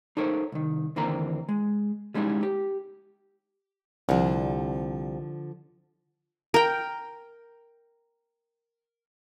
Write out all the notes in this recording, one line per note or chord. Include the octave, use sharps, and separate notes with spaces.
D#4 A4 A#4 C5 C#5
C2 D#3
D#2 D3 E3 A#3 C4 A#5
G#3
G3 G#3 C#4 D#4 E4
G4
C2 D3 F3
A#4 G5